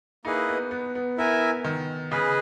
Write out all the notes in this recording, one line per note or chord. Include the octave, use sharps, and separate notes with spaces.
A#3 D#4 E4 G#4 B4 D#5
B3
B3
B3
B3 E4 A#4 E5 G#5
D#3
C#3 G#4 B4 D#5